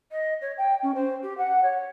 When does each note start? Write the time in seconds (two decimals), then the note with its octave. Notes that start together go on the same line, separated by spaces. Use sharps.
0.12 D#5
0.42 C#5
0.58 G5
0.83 C#4
0.95 C5
1.23 G4
1.38 F#5
1.63 C#5